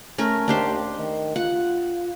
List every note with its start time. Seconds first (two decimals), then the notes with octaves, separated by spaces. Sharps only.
0.18 A3 C#4 A#4
0.48 D#2 D4 G4 C5
0.98 D#3
1.36 F4 F#5